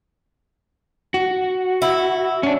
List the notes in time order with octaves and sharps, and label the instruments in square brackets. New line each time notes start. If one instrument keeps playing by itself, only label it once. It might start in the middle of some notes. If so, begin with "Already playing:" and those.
[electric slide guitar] F#4
[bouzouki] E4
[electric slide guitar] C#4 D4